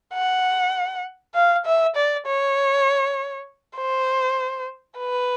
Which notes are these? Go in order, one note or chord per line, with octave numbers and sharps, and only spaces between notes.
F#5
F5
E5
D5
C#5
C5
B4